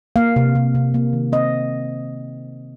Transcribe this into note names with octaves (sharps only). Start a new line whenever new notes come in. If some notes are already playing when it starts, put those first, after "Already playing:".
A#3 F5
C3
C3
C3
A#3
D#3
C4 D#5